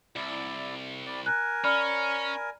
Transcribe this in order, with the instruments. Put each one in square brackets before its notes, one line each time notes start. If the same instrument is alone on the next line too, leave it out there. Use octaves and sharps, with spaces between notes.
[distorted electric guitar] C2 [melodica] E4 D5
[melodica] G3 D5
[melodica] A#4 G#5 [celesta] F#6
[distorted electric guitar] C#4 [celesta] D5 B5 F6